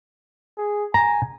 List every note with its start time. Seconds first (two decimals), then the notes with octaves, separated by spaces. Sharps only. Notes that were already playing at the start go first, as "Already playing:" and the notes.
0.58 G#4
0.94 G#5 A#5